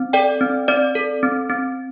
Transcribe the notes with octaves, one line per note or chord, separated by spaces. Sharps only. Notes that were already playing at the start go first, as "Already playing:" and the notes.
Already playing: C4
A4 D5 G5
C4
C4 D5
A4
C4
C4